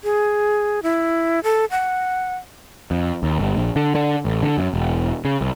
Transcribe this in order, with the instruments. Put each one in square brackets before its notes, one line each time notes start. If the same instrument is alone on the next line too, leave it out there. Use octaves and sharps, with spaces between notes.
[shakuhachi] G#4
E4
A4
F#5
[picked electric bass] F2
D#2
G1
A#1
D3
D3
A1
D3
F#2
E1
C#3
C2